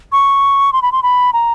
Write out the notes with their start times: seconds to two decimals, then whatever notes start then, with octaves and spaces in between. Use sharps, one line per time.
0.12 C#6
0.73 C6
0.82 B5
0.92 C6
1.03 B5
1.33 A#5